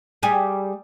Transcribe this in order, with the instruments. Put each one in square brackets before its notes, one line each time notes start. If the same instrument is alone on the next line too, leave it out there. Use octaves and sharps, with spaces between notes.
[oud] G3 G4 G#4